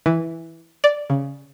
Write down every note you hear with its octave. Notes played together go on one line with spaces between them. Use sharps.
E3
D5
C#3